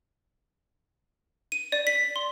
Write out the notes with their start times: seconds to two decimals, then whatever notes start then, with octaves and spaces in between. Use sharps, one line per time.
1.52 D#7
1.72 D5
1.87 B6
2.16 C6